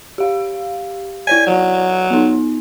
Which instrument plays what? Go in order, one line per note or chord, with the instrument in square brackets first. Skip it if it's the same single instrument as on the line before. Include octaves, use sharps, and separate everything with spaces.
[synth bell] G4 F5
[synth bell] E4 C#5 D5 [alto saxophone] G#5
[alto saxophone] F#3
[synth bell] B3 D#4